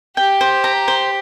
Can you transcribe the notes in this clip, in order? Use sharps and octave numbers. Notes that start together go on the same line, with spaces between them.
G4 G5
C5
A#5
C5